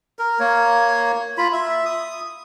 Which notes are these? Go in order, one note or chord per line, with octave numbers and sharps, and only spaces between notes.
A#4
A#3 C#5
F4 B5
E5
D#6